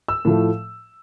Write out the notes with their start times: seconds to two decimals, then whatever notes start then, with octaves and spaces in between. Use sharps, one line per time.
0.08 E6
0.25 A2 F3 A3